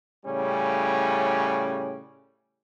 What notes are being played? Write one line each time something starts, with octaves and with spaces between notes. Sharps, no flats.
A2 C#3 G3 C#4